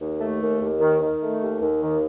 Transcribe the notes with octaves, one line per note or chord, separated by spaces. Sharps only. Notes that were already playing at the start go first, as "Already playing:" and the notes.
D#2
A3
D#2
D#2
D#3
D#3
A3
D#2
D#2
D#3